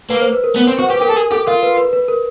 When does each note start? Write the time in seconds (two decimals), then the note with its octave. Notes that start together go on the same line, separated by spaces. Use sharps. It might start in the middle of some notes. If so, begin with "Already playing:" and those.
0.10 A#3 B4
0.22 C5
0.33 B4
0.44 A#4
0.56 B3 A#4
0.67 C4
0.79 F#4 C5
0.90 G4 B4
1.01 G4 A#4
1.10 A4
1.16 G#4 A#4
1.32 G4 A4
1.47 F4 A#4
1.63 B4
1.78 B4
1.93 B4
2.08 A#4